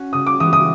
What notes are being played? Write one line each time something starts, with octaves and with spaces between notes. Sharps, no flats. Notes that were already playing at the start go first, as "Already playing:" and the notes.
Already playing: C#4 F#4
C#3 D#6
D6
E3 G#3 B3 D#6
D#6